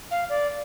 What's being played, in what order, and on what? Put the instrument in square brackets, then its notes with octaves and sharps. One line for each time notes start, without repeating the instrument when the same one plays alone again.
[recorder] F5
D5